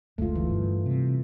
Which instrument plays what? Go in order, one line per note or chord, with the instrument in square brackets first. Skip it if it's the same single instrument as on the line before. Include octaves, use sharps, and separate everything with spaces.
[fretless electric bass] F#1 D2 G#3 [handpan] A3 F4
[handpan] E3
[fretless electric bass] G2
C3